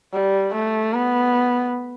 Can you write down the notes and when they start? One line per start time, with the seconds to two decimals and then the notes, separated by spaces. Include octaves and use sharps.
0.13 G3
0.54 A3
0.93 B3